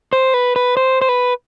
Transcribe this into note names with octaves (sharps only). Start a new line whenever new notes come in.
C5
B4
B4
C5
C5
B4